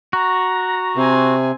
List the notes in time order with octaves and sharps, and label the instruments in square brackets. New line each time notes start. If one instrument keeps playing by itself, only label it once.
[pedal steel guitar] F#4 [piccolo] A#5
[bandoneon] C3 [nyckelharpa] C4 G#5